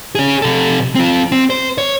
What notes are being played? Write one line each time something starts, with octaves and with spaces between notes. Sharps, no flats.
C#4 G#4
C3 A4
C4 F4
C4
C5
C#5